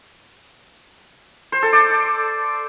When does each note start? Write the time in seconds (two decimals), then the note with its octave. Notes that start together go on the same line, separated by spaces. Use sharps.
1.52 C5
1.63 A4
1.73 D5